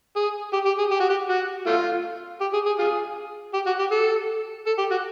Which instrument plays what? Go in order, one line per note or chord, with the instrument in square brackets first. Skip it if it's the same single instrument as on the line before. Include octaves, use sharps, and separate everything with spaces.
[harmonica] G#4
G4
G4
G#4
G4
F#4
G4
F#4
A3 F4
G4
G#4
G#4
F4 G#4
G4
F#4
G4
A4
A4
G4
F#4